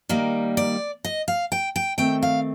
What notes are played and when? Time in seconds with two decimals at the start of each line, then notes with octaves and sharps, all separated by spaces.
0.09 D#3 G3 A#3
0.57 D5
1.04 D#5
1.28 F5
1.52 G5
1.76 G5
1.98 D#3 A3 C4 G5
2.23 F5